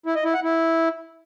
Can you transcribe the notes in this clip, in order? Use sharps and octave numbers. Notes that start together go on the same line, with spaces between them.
E4
D#5
E4
F#5
E4